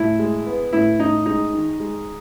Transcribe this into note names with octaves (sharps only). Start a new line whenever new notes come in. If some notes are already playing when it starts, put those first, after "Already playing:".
Already playing: A2 E4
G#3
B3
A2 E4
A2 D#4
G#3 D#4
D#3
G#3